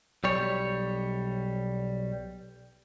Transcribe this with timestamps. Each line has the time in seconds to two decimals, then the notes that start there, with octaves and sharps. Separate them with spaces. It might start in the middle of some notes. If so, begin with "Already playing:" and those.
0.24 B1 G3 C#5